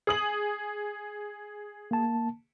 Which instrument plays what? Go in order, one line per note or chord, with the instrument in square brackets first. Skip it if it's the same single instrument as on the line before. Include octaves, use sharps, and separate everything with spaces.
[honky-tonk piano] G#4 D#6 F#7
[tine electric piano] A#3 A5